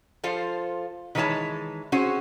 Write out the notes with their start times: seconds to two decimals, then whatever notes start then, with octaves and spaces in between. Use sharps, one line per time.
0.24 F3 F4 A4 C5
1.15 D#3 E3 G#3 B4 C#5 A5
1.92 C4 C#4 F#4 G#4 C5